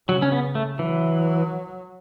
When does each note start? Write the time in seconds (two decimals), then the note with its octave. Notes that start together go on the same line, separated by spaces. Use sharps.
0.09 C#3 F#3
0.22 C#4
0.32 B3
0.55 A3
0.79 E3 F#3